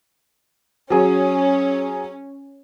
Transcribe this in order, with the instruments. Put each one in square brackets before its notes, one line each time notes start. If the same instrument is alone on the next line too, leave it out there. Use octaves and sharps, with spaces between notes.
[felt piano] F#3 G#4 [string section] C#4